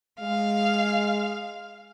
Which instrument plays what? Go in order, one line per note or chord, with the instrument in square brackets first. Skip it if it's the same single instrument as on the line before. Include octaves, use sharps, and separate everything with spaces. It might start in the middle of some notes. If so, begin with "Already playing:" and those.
[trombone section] G#3 [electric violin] F5